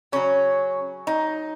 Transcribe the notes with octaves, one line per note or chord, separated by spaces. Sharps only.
C#3 F#3 C#4
D#4